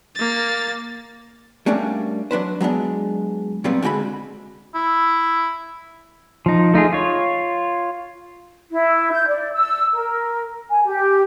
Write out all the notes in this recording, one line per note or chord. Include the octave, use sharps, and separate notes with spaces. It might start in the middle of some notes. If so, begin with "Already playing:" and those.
A#3 A6
G3 A3 A#3 C#4 D4
F#3 D4 B4 C5
F#3 G#3 B3 D4
A#2 F#3 G3 B3 C4
D3 G#3 F#4 G5 B5
E4
F3 D#4
A3 D#4 F4 G#4
F4 C#5
E4
G6
D5
E6
A#4
G#5
G4